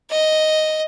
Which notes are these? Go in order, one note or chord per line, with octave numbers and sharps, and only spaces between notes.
D#5